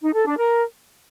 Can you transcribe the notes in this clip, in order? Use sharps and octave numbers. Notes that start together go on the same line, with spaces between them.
D#4
A4
D4
A#4